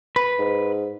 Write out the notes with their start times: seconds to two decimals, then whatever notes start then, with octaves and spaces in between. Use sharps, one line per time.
0.16 B4
0.39 G#2